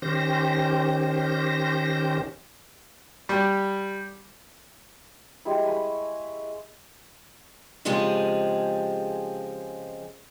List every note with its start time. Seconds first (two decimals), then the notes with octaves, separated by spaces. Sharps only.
0.02 D#3 C#4 G4 C5 A#6
3.29 G3
5.45 G3 G#3 E4
5.65 G#5 B5 C#6
7.85 C#3 F3 G#3 C4 G4 G#4